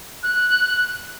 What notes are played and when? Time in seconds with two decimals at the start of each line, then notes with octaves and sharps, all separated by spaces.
0.23 F#6